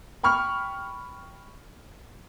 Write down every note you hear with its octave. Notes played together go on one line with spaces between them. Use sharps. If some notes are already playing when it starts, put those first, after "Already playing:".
G5 B5 C#6 F6